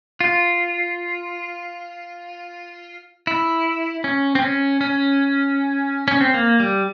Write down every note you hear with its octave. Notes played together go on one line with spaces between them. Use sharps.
F4
E4
C#4
C4
C#4
C#4
C#4
C4
A#3
G3